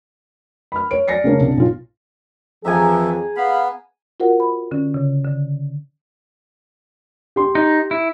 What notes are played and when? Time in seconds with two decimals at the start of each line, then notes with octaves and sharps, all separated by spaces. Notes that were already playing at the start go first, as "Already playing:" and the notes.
0.72 B5 F6
0.91 C#5 D7
1.08 D5 G#5 A6 A#6 C7 C#7
1.24 C#3 A#3 C#4 D4
1.40 C2 D4
1.57 B1 F4
2.65 F2 E3 F3 G#4 E5 G#5 A#5
3.37 B3 F5 B5
4.20 F4 F#4 A#4 C5 F#5
4.40 B5
4.71 D3 C#4
4.94 C#3
5.25 D3
7.36 G4 C6
7.55 D#4
7.91 E4